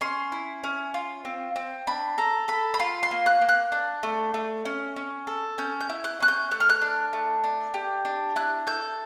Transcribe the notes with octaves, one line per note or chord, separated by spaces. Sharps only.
C#4 C6
E4
C#4
F4
C4
C4
D4 B5
A4 A#5
A4 B5
B5
F4 C6
C6
A#3
F#6
A#3
F#6
D4
A3
A3
C#4
C#4
A4
C#4 G6
G6
E4
F#6
C#4 F#6
G6
A3 F#6
F6
F#6
D4
A3
D4
G4
D4
E4 F#6
A4 G6